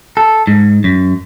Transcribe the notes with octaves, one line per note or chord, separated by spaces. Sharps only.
A4
G#2
F#2